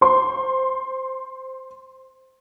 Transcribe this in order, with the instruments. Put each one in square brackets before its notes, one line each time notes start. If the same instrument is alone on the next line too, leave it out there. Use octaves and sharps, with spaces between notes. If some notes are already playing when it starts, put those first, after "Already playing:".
[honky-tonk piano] C5 C6